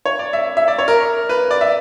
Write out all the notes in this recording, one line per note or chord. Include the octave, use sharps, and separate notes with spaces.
C#5
D5
E5
E5
D5
C#5
A#4
B4
D5
E5